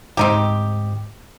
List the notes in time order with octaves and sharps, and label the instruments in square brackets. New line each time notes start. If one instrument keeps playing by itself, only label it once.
[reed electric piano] D2 G#2 [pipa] C4 D#4 G4